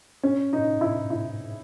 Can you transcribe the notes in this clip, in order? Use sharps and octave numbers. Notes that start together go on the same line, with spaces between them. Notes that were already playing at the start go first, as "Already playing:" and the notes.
C#4
D#4
E4
E4